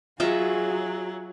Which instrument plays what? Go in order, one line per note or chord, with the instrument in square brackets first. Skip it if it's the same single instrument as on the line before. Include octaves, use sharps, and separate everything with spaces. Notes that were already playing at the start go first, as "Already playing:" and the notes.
[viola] F#3 [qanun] F4 D#5 E5 [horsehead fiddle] F#4 G#4